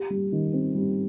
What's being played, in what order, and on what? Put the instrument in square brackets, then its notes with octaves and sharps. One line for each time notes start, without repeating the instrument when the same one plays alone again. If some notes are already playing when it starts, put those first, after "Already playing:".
Already playing: [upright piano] G4
G3
D#3
C4
G3